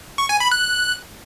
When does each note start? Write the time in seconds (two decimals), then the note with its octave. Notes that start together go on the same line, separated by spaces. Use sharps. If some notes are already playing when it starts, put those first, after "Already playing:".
0.18 C#6
0.29 G#5
0.40 B5
0.51 F#6